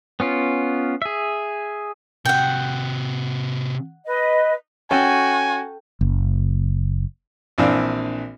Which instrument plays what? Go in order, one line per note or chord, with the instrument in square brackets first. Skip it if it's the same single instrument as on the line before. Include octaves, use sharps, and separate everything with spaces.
[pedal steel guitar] B3 C#4 F4
G#4 E5
[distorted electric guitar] C3 F#4 [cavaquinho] F#5 G5
[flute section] B4 D#5
[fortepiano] C#4 [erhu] F#4 [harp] A4 G5 D#7 [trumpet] G#5
[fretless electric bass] F#1
[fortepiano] A#1 E3 C4 D4 F5